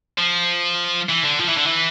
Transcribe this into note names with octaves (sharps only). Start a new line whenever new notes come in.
F3
E3
D3
F3
E3
D3
E3